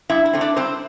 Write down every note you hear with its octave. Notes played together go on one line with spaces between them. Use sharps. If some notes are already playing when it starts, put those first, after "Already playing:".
G2 E4
E4
D3 A3 C4
D4 D5
G2 C4 C5